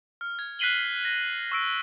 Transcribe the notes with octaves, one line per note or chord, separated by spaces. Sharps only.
F6
G#6
F#6 B6 C7 D#7 F#7 G7
A#6
C#6 E6 D7